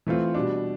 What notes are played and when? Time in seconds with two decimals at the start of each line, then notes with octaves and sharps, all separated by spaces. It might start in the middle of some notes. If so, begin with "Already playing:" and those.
0.07 E3 A3 C4 F4
0.34 B2 G3 D4